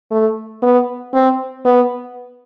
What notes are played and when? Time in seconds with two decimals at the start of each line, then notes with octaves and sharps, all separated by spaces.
0.11 A3
0.63 B3
1.13 C4
1.65 B3